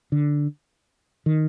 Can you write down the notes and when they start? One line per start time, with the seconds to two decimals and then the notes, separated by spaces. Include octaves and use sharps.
0.12 D3
1.26 D#3